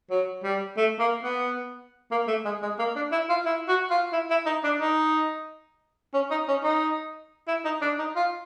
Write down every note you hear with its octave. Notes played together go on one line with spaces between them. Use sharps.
F#3
G3
A3
A#3
B3
A#3
A3
G#3
G#3
A#3
D4
E4
F4
E4
F#4
F4
E4
E4
D#4
D4
D#4
C#4
D#4
C#4
D#4
E4
D#4
D4
D#4
F4